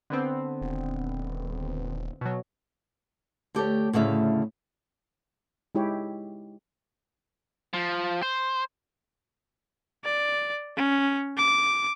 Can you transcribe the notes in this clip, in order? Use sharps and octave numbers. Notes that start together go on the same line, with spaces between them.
D3 B3 C4
D#1
B2 F#3
D2 G4 A4 C#5
D2 A2 C#3 E5 F5
G#3 D#4 E4 G4 C#5
F3
C5
D5
C#4
D6